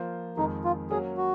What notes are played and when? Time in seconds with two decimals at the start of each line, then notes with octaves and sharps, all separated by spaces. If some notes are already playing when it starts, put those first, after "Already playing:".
Already playing: F3 A#3 F4 C5
0.37 F2 D#3 G#3 D#4
0.64 F4
0.90 F#3 A#3 C#4 G#4
1.17 F#4